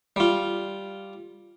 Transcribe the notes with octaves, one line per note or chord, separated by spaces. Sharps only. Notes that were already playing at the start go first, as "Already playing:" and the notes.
G3 F4